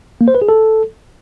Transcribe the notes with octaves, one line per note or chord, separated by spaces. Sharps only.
A#3
C5
B4
G#4
A4